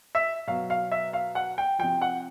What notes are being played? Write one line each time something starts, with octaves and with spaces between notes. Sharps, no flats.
E5
B2 F#3 F5
F5
E5
F5
F#5
G5
C3 F3 G5
F#5